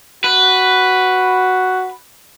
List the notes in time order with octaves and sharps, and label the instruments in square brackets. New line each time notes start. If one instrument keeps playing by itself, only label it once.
[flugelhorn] F#4 [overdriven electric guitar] B4